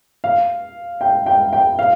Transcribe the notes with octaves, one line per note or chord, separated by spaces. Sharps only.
F5
G5
G5
G5
F5